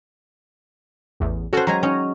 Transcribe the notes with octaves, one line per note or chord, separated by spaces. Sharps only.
A1 E2
C#4 F#4 A4 C5
F#3 G#3 G#5 A#5
C#4 D#4